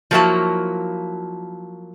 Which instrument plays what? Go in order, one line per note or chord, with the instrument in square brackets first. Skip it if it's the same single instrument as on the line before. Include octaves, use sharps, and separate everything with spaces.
[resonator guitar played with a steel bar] F3 F#3 A#3 E4 F#4 A5